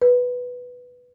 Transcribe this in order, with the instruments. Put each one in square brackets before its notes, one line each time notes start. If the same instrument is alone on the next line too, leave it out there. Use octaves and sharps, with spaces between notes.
[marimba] B4